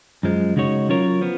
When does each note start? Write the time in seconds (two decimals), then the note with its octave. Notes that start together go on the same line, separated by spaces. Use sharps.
0.23 F#2 F3 G#3
0.56 C#3 G#3 D#4 F#4 C#5
0.89 F#3 C#4 F4 A#4 C#5
1.21 F3 B3